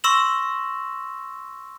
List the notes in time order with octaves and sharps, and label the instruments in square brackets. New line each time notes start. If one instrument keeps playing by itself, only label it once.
[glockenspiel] C6 C#6 E6 A#6 E7 F#7